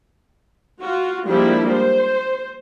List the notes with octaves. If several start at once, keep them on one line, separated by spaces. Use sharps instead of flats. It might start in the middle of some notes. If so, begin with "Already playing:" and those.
F4 F#4
F3 G3 G#3 A#3 D4 E4
C5